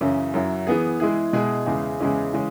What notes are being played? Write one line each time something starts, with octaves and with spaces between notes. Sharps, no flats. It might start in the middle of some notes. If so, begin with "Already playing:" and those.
F#2 C#3 E3 C#4 E4
F#2 F#3 E4
E3 B3 G#4
E3 G#3 E4 G#4
B2 G#3 E4 G#4
E2 C#3 G#3 E4
E2 C#3 G#3 C#4 E4
C#3 E3 G#3 C#4